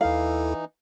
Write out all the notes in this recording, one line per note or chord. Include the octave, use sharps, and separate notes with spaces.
D#2 E3 D#4 E4 A4 F5